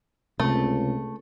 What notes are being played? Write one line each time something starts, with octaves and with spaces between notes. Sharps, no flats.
C#2 C3 A3